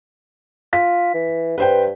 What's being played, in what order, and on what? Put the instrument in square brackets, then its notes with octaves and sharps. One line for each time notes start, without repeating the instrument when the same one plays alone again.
[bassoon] F4 [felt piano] B6
[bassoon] E3
[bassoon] G2 [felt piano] B4 C5 G5